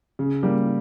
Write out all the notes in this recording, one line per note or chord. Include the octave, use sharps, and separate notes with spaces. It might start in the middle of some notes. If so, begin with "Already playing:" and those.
C#3
G3 A#3